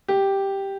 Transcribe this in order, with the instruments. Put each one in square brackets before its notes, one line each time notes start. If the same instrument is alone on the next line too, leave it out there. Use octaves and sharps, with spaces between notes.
[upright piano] G4